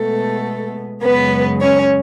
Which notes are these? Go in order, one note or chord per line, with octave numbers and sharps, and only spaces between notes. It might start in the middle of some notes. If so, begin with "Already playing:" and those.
Already playing: B2 G#3 A3 B3 A4
F#2 C#3 G#3 B3 B4
C#4 C#5